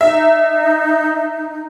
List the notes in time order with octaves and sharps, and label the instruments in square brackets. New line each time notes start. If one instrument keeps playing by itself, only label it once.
[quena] D#4 [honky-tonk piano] E5